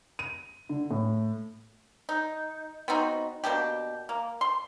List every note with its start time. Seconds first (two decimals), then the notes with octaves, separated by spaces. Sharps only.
0.19 D#7
0.69 D3
0.91 A2
2.09 D#4
2.88 B3 C4 D#4 F#4
3.44 B2 A#3 D4 G4
4.09 A#3
4.41 C6